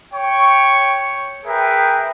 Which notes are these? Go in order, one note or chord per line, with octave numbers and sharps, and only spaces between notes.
C#5 G5 C#6
G#4 A#4 B4 E5 G5